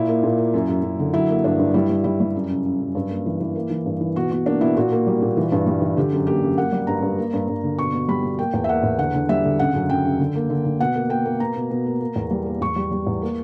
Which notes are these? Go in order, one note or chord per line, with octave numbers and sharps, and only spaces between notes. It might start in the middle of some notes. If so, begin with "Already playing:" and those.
Already playing: A#2 E4
A#3
A#2
A#3
F#2
F#2
F#2
D3
F#3 E4
A#3
G2 D4
G2
G3 E4
G3
G3 E4
G3
F#2
C#3
C#3
F#2
G2
A#3
E3
E3
A#3
E3
G2
E3
B2 F#4
B2 F#4
A#3 D4
B2 E4
A#2 F#4
A#3
G3
A#2
E3
G2
G3
E3
D3 G4
F#2
A#3 G4
F#2
A#3 F#5
G3
G2 A#5
G2
A#3
G2
G2
D3
B2 C#6
B2
G3 B5
B2
A#3 G5
E2
E5
A#3 F#5
E2
D3 F#5
D3
G3 E5
D3
C#3 F#5
F#2
F#2 G5
C#3
D3
A#3
D3
D3
B2 F#5
A#3
A#3 G5
A#3
B2 A#5
B2
B2
A#3
A#3
E2
G3
A#3
E2 C#6
G3
G3
E2
A#3